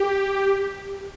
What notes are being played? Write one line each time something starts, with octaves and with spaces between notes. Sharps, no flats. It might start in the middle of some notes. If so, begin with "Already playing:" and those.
Already playing: G4